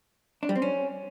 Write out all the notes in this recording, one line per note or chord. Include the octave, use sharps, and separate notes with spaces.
D4
G3
C4
C#4